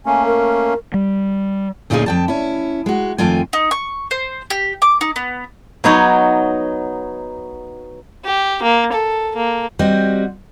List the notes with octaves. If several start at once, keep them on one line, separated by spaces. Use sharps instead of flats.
A3 A#3 C#4 G#5
A#4
G3
D2 A#2 C#4 D#4 F4 G#4
F2 G5 A5
C#4 E4
G#3 F#4
F2 D#3 A3 F4 G5 G#5
D#4
C#6
C5
G4
D6
D#4
B3
F#3 B3 D#4 C#5
G4
A#3
A4
A#3
G3 C4 F#4 D#5